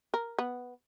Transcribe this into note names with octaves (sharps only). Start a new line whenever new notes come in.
A#4
B3